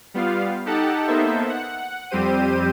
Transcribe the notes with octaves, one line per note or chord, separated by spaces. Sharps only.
G3 B3 F4 F5
D#4 G4 A4 F#5 A5
A#3 B3 D#4 A4 C5 E5
F#5
F2 G3 C4 G4 C5 D#7